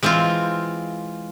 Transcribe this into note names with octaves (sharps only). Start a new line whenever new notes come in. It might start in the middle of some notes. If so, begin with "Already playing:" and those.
E3 G#3 C4 F4